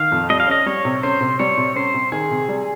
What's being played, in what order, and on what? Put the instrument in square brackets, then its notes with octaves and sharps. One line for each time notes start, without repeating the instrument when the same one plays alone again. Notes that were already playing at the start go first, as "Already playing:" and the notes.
Already playing: [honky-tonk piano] D#3 [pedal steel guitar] F5
[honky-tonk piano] F2
[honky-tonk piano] G3 [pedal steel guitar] D#5
[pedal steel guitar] F5
[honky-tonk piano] C#4 [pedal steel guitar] D#5
[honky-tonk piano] G3 [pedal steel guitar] C#5
[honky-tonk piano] C3
[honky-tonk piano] C#4 [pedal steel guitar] C5
[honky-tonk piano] C3
[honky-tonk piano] G3 [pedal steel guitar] C#5
[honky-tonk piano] C3
[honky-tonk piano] C#4 [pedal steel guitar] C5
[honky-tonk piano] C3
[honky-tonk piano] D#3 [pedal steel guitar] G#4
[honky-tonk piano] C3
G3